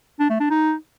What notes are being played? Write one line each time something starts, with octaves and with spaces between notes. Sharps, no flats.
D4
A3
D4
D#4